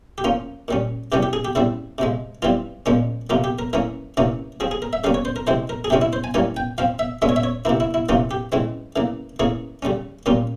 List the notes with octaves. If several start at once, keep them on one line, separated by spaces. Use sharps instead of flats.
G4
F3 A#3 C#4 F4
A#2 G3 C#4
C3 E3 G3 C#4 G4
G4
G#4
G4
C#3 G3 C4 E4
C3 F3 G#3
E3 G3 C4 F4
A#2 F3 G#3 C#4
C3 F3 A#3 F4
G4
A#4
E3 A#3 C#4 A#4
C3 E3 A#3 C#4
F3 C4 G#4
G#4
A#4
E5
C#3 G3 A#3 C#4 F5
C#5
C5
A#4
C3 E3 G#3 C4 C5
A#4
G#4
C3 E3 G#3 C#4 G4
E4
C5
G#5
E3 G3 A#3 C#4 G#5
G5
F3 C4 F5
E5
A#2 G#3 C#4 E5
C#5
E5
C#5
C3 E3 A#3 E4
E4
E4
C3 E3 A#3 C#4 F4
G4
C#3 E3 G#3 C4
C#3 E3 A#3
E3 A#3 C#4 G#4
C#3 G3 C#4
A#2 G3 A#3 C#4 F4